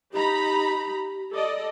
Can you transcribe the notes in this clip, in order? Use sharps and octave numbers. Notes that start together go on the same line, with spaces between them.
D#4 G4 A#5 B5
A4 D5 D#5